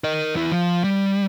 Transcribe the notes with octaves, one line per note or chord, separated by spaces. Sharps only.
A#4 D#5
E2 E4
F3
G3